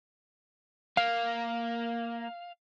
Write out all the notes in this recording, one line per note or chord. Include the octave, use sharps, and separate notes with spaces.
A#3 F5